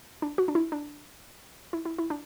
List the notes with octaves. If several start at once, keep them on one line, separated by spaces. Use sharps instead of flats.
D4
F#4
D4
E4
D4
E4
E4
E4
D4